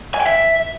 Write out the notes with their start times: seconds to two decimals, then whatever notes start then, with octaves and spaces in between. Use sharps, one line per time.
0.14 G#5
0.20 G5
0.27 E5